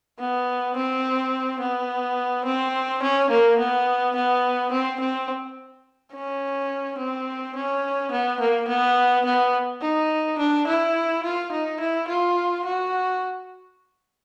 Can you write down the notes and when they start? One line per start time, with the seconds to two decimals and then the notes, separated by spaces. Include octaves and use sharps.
0.19 B3
0.76 C4
1.60 B3
2.45 C4
3.03 C#4
3.30 A#3
3.58 B3
4.16 B3
4.72 C4
5.00 C4
6.13 C#4
6.98 C4
7.55 C#4
8.11 B3
8.40 A#3
8.68 B3
9.25 B3
9.81 D#4
10.38 D4
10.67 E4
11.24 F4
11.52 D#4
11.80 E4
12.08 F4
12.65 F#4